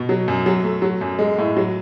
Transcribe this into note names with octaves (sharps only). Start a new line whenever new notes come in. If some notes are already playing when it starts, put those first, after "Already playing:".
Already playing: B2
F#3
F#2
F#3
A3
F#3
F#2
G#3
A2
F#3